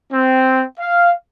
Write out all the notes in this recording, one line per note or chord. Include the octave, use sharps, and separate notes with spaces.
C4
F5